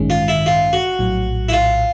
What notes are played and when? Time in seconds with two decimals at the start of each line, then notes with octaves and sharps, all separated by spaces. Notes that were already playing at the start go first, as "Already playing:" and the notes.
Already playing: A1 G2 D#3 G#3 C#4
0.10 F4
0.28 E4
0.46 F4
0.73 F#4
0.99 A#1 A2 F#3
1.49 E4
1.52 F4